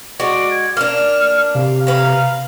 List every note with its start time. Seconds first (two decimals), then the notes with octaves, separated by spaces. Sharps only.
0.20 G#3 F#4 D5
0.51 G#6
0.77 A#3 D4 F6
1.55 C3 F5
1.87 B4 F5 A#5